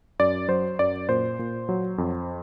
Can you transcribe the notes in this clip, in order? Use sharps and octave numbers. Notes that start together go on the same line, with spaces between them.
F#2 D5
F#3 C5
F#2 D5
A#2 C5
A#2
F#3
F2